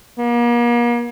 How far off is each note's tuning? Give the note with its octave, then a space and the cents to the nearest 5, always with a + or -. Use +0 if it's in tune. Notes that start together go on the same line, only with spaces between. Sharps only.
A#3 +40